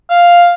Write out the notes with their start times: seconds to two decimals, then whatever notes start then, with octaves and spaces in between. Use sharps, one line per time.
0.10 F5